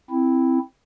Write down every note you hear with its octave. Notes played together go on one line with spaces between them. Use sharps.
C4 E4